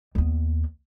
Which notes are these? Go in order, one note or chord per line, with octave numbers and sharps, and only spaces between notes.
D#2 B3